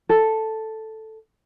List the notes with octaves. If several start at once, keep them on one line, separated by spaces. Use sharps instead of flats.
A4